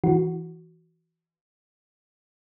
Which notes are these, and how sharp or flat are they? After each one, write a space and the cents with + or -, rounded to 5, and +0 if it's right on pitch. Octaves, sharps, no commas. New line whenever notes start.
E3 +0 F#4 +0